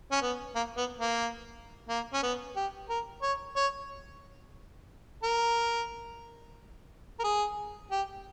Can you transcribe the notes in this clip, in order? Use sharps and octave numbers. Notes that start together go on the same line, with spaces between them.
C#4
B3
A#3
B3
A#3
A#3
C#4
B3
G4
A#4
C#5
C#5
A#4
A#4
G#4
G4